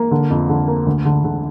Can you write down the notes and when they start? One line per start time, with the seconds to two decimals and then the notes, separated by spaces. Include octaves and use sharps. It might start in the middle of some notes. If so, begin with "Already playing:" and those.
Already playing: A#3
0.11 D3
0.30 F2
0.49 D3
0.68 A#3
0.86 D2
1.05 D3
1.24 D3